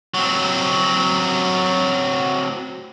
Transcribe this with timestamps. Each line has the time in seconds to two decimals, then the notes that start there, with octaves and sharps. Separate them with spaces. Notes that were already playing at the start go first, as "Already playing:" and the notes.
0.14 F#3 C4